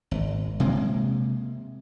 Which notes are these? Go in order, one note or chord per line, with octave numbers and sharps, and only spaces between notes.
G#1
C3 G#3 A#3